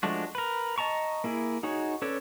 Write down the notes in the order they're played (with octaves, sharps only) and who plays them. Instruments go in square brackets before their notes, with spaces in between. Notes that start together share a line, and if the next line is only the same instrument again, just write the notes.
[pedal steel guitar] F3 G#3 A3 D4 F#4
A#4 B4
D#5 A5 A#5 C#6
A#3 E4 G#4
D#4 F#4 G#4 C#5
C#4 A4 B4 C#5 D5